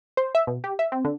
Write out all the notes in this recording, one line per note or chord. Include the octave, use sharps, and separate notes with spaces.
C5
E5
B2
G4
E5
C4
D3